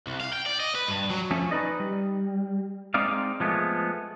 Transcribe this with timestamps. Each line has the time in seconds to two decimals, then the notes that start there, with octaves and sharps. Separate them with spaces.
0.07 C2
0.21 F5
0.33 G5
0.46 D5
0.60 D#5
0.75 B4
0.88 G2
1.11 F#3
1.31 F3 A3 C#4
1.51 D#4 B4 D5 D#5
1.80 G3
2.94 G#3 C4 D#4 D5 F5
3.40 F3 G#3 A3 B3